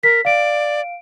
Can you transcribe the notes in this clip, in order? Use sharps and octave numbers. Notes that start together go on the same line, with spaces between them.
A#4 B6
D5 F5 D7